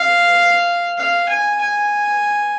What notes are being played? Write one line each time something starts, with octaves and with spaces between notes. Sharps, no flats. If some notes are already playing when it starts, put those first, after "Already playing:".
Already playing: F5
F5
G#5
G#5